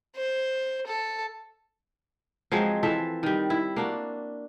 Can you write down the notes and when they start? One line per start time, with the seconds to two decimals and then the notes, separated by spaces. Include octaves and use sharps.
0.16 C5
0.87 A4
2.52 F3 F#3 G#3 C4
2.83 E3 F3 A4 E5
3.23 D#3 G3
3.50 E4
3.76 A#3 D4 F#4